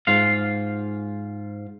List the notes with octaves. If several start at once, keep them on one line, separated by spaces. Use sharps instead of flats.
G#2 F4 F5